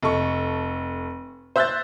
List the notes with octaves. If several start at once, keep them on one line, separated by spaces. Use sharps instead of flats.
F1 A4 C#6
C5 E5 E6 F#6 G6 A6